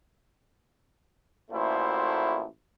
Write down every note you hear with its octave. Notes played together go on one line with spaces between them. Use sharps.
A1 A#2 A3 E4 F#4 C5